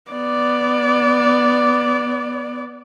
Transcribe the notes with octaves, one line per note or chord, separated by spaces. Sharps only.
B3 D5